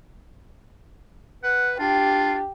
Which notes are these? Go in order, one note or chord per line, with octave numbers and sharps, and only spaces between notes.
B4 F#5
D4 F4 G4